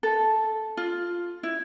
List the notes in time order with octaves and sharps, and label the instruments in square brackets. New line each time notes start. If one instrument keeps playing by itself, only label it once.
[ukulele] A4
F4
E4